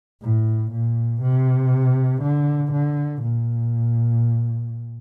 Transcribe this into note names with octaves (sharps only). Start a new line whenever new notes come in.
A2
A#2
C3
D3
D3
A#2